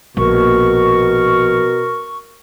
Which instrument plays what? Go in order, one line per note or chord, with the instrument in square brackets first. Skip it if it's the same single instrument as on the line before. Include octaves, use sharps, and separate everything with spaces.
[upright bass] A#1 [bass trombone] B2 [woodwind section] A#4 C#6